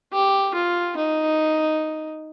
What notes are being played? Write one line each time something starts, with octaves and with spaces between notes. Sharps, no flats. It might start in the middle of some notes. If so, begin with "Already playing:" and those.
G4
F4
D#4